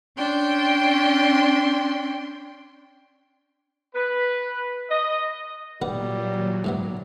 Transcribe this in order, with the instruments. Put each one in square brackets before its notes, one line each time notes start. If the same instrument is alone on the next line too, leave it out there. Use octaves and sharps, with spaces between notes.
[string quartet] C#4 D4 G5 C6
[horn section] B4
D#5
[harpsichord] B1 B4 F#5 [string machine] A#2 F#3 [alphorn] G3
[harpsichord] G#2 C3 B3